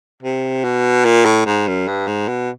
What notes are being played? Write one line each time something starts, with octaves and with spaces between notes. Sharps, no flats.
C3
B2
A#2
A2
G#2
F#2
G2
G#2
B2